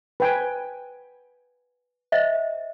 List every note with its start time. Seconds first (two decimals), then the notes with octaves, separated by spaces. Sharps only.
0.20 B4 G5 G#5
2.12 C5 D#5 E5